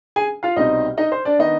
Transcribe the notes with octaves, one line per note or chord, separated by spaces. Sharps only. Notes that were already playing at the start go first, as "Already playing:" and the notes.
G#4 G#5
F4 F5
C2 B2 G3 C4 D#4 D#5
D#4 D#5
C5
D4 D5
D#3 B3 D4 D#4 D#5